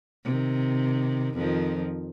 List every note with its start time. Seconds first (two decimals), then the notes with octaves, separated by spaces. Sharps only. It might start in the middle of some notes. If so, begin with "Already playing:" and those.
0.25 C3 D#3
1.35 F2 D#3 F3